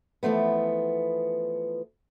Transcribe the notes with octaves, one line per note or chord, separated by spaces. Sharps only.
E3 F3 A3 B3